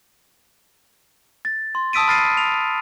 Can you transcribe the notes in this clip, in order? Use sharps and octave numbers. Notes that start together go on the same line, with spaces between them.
A6
C6
A5 D#6 E6 B6 D7 D#7
B5 F6 A6 C7 D#7
F7